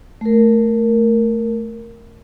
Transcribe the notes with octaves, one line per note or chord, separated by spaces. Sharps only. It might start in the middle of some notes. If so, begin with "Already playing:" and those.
A3 A#4